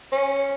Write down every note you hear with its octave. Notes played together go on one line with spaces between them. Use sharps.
C#4